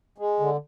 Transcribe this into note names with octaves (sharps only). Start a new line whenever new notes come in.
G#3
D3